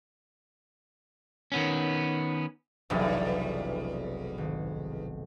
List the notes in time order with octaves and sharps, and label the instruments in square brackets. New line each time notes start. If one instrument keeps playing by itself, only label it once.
[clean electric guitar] D#3 B3 C#4
[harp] F1 B1 [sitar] E2 G2
[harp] G#1